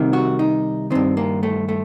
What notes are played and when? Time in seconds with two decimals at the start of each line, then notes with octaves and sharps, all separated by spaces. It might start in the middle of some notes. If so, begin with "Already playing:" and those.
Already playing: C2 C3 D#3
0.13 F#4
0.39 D#4
0.91 G2 D#3 C4
1.17 A#3
1.43 A3
1.69 A3